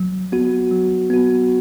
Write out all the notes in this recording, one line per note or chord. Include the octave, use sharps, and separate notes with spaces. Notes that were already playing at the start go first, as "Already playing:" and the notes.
Already playing: F#3
B3 F#4
F#3
B3 F#4